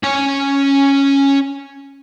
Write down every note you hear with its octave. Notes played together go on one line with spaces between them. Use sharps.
C#4 G#5